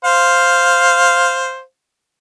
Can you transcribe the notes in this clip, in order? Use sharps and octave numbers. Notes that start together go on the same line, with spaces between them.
C5 F5